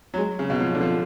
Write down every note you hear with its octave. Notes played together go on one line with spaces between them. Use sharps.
F#3
G#3
C#3
B2
F3
D3
F3